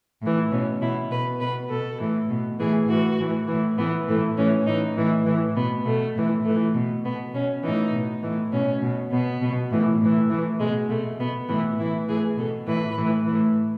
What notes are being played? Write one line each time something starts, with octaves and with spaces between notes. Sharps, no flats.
A2 E3
B2 C#4
B2 E4
B2 B4
B2 B4
B2 A4
A2 E3
B2
A2 E3 G#4
A2 E3 F#4
A2 E3
A2 E3
A2 E3 B3
A2 E3 A3
A2 E3 C#4
A2 E3 D#4
A2 E3
A2 E3
B2 B3
B2 A3
A2 E3
A2 E3 A3
B2
B2 B3
B2 C#4
A2 E3 D#4
B2
A2 E3
B2 C#4
B2
B2 B3
B2
A2 E3
A2 E3
A2 E3 A3
B2 G#3
B2 A3
B2 B3
A2 E3 B3
A2 E3 E4
A2 E3 G#4
B2 A4
A2 E3 B4
A2 E3
A2 E3